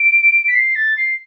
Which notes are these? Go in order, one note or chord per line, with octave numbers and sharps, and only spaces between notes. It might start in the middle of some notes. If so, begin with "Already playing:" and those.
Already playing: D7
B6
C7
A6
C7